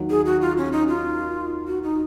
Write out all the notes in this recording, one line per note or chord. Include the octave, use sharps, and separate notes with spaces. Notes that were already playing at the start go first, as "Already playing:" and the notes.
Already playing: D#2 D#3 F#3
G#4
F#4
F4
C#4
D#4
F4
F#4
D#4